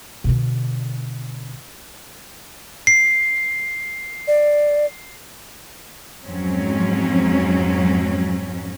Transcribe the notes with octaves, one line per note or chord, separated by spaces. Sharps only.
B2 D3
C7
D5
F2 G#2 F#3 C4 C#4